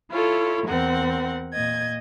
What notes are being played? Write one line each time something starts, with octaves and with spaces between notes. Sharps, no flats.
E4 F4 A4 C#5
E2 C4 A#4 F#5
A#2 D#5 G#6